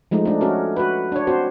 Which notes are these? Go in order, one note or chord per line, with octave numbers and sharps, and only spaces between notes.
F3 G#3 A3 D#4
A3 D4
C#4 F#4 A#4
F#4 B4
D4 C#5
C4 F#4 C5